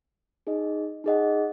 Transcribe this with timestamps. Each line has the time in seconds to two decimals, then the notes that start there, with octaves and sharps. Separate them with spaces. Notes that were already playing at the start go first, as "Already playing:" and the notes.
0.47 D#4 G#4 D#5
1.04 D#4 G#4 D#5 F#5